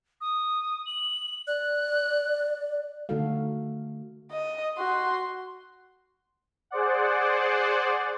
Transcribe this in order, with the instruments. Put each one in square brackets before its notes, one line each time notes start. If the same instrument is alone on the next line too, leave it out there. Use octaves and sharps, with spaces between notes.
[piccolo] D#6
F#7
[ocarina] D5 [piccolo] F#6
[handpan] D3 A3 D#4 F#4 A4 F5
[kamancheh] D#5
F#4 C6
[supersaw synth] G#4 C5 D5 F#5